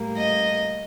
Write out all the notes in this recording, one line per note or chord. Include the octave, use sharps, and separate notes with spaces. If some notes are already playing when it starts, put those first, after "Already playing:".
Already playing: A2 G3 A#3
D#5